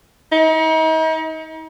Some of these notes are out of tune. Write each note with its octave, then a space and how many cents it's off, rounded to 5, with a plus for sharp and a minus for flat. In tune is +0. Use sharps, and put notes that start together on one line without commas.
D#4 +40